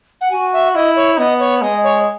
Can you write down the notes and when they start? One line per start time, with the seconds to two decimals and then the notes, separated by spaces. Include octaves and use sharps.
0.21 F#5
0.31 F#4 G#5
0.53 E5
0.75 E4 D#5
0.96 C#5
1.18 B3 D#5
1.39 C#5
1.62 G#3 D#5
1.83 C#5